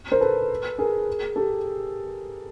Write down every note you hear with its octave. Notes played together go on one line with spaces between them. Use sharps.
A#4 C5
A4 B4
G#4 A#4
G4 A4